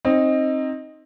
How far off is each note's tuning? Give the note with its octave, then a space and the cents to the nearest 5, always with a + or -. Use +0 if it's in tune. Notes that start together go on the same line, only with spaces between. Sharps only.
C4 +20 D#4 +0